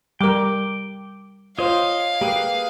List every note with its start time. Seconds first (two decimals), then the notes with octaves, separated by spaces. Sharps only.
0.21 G3 A#4 G5 D6
1.59 F4 C5 C#5 D#5 F5
2.21 A#3 G4 G#4 B4